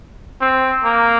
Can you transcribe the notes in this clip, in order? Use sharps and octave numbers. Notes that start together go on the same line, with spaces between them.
C4
A#3